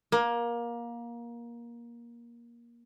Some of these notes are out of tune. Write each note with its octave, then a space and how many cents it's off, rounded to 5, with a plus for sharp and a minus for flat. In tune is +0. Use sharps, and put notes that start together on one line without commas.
A#3 +20